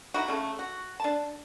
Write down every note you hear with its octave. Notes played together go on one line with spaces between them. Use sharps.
D#4 E4 F#4
C#3 A3
F#4
D4 A5